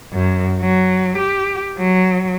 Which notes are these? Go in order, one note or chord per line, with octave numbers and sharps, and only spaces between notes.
F#2
F#3
G4
F#3